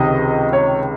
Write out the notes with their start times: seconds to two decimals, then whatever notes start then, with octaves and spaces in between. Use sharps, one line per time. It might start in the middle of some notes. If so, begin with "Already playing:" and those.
Already playing: C#2 C3 D#3 D#5
0.53 C#5